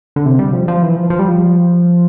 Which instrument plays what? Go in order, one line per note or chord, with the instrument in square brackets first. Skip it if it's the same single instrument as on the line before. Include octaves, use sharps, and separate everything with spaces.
[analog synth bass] D3
C3
G3
F3
F3
E3
F3
F3
G3
F3